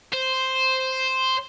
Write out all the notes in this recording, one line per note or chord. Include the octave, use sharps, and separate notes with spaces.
C5